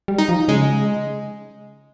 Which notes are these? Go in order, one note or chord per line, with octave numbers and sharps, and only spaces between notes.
G3
D#4
F3
C#3 G#3